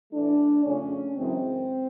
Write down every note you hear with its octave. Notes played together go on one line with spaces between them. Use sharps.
A2 E3 A3 D4
F2 C#3 F3 A3 C#4
F#2 C#3 E3 G#3 C4